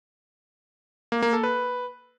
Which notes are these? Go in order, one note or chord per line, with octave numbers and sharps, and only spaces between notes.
A#3
A#3
A4
B4